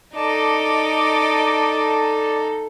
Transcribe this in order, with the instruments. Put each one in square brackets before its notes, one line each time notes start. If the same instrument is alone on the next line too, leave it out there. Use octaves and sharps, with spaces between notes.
[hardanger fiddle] D#4 A4 [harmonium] D5 A5 [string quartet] D#5 D6